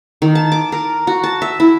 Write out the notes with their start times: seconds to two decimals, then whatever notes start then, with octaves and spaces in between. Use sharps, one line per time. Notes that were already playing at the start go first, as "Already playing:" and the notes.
0.22 D#3
0.35 A5
0.52 D6
0.72 A#4
1.07 F#4
1.24 A5
1.42 E5
1.60 E4